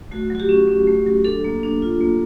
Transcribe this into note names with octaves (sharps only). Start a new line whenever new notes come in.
A3 F#4
F#3 F#4
G4
C#4
C#4
A3
F#3
D4 A4
A#3
D4
F4
A#3